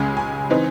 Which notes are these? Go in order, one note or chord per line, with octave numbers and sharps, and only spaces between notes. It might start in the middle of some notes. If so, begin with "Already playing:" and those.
Already playing: C#2 C#3 G#3 C#4 G#5
G#5
E3 C4 D#4